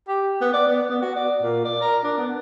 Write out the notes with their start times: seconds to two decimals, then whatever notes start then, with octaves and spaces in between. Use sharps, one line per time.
0.08 G4
0.41 B3
0.53 D5
0.67 B3
0.90 B3
1.02 F#4
1.15 D5
1.41 A#2
1.65 D5
1.81 A#4
2.03 D4
2.18 B3